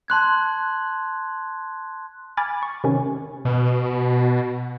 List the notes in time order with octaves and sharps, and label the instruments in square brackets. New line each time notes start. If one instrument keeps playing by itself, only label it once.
[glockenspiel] A5 C6 F#6 G#6
[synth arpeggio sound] G#5 B5 D6 F6 G#6 A6
C#6
C3 D#3 C#4
[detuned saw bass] B2